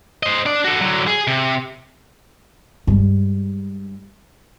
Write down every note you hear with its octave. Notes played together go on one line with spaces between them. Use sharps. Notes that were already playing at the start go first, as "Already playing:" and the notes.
C5 D#5
D4 D5
F#4 A4
D3 F#3
G#4
C3
G2 G#3